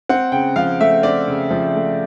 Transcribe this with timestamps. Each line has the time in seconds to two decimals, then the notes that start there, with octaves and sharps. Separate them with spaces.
0.09 C4 F#5
0.32 C#3 G5
0.56 F3 F5
0.80 A3 E5
1.03 C4 D5
1.27 C#3
1.51 F3
1.75 A3